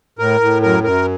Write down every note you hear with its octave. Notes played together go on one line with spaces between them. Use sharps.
A2 A#4
A2
F#2 A#4
F#2 A#4